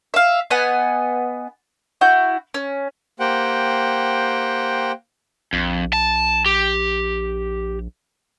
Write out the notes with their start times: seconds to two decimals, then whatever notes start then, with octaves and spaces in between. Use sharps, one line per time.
0.14 E5 F5
0.50 B3 D#5 F#5 G#5
2.01 E4 F#4 G6
2.54 C#4
3.20 A#3 G4 C5 F#5 G5
5.53 A#1 F2
5.93 A5
6.46 G4